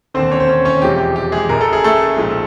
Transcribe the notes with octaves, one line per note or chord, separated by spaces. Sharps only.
E1 D#2 D3 C4 C5
C#4 C#5
C5
C#4 C#5
C#4 C#5
E1 E2 C3 F3 G#3 G4
G4
G4
G#3 G#4
F#1 F#2 C#3 A#4
A4
G#4
A3 A4
B1 A#2 F3 G#3